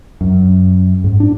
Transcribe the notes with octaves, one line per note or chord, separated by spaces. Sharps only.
F#2
G#2
D4